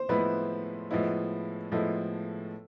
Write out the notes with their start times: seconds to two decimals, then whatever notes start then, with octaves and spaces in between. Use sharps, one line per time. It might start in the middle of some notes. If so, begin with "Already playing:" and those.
Already playing: C5
0.09 A2 F3 G#3 B3 E4 B4
0.91 A2 F3 G#3 B3 E4
1.72 A2 F3 G#3 B3 E4 A4